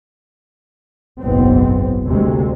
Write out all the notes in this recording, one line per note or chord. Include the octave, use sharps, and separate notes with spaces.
F#1 B1 G#2 B3 C4
D2 C3 G#3